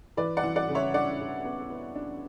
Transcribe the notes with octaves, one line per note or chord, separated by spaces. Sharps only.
E3 B4 D5
D5 F#5
E3
D5 F#5
C#3
C#5 E5
D4 D5 F#5
C#3
B3
B3
D4